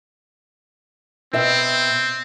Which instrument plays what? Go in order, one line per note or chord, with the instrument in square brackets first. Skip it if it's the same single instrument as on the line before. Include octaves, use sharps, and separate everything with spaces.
[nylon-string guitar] B2 E5 G5 [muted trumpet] C4